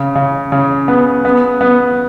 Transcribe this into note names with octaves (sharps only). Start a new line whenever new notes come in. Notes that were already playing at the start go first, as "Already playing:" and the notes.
Already playing: C#3
C#3
C#3
B3
B3
B3